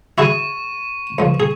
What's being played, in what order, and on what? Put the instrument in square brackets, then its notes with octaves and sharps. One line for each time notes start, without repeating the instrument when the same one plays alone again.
[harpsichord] E4 F#4 G#4 [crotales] C#6 D#7
[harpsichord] C#2 F3
G#4